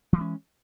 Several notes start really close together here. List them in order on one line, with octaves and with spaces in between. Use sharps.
E3 F#3 G#3 C#4